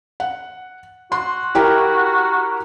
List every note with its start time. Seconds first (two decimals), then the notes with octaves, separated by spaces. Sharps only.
0.20 F#5
1.12 F#4 C6
1.55 E4 G4 A#4